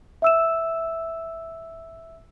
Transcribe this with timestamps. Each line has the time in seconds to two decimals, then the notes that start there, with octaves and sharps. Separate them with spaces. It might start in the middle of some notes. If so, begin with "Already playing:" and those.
0.22 E5 E6 E7